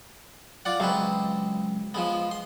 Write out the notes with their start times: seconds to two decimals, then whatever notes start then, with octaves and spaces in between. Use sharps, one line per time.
0.65 F4 D5 F#5
0.80 C#2 F#3 G#3 C4 B4 F5
1.94 F3 G#3 B3
2.31 C6